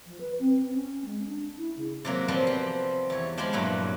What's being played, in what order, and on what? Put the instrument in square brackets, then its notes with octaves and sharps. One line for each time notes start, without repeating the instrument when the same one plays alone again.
[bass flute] F3
B4
C4
C#4
G#3
D4
E4
C#3
[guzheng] C3 F#3 A#3
C3 F3 G3 B3 C4 C5
C4
E2 C#5
F3 G#3 G4 C5 B5
G2 A#2 F#3 A#3 E4